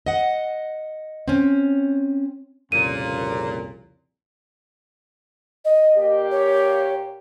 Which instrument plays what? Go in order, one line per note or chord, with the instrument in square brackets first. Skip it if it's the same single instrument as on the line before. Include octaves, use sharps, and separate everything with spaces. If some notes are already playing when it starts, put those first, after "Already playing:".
[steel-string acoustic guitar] D#5 F#5
C4 C#4
[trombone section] C2 F2 C#3 [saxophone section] A#2 [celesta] D#7
[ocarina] D#5
[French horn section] A#2 A#3 G4
[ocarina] C#5